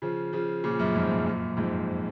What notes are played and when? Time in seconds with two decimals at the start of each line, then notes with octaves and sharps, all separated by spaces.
0.02 C#3 F3
0.33 C#3 F3
0.64 A#2 C#3
0.79 F#2 A#2
0.95 F2 G#2
1.10 F#2 A#2
1.26 F#2 A#2
1.57 F2 G#2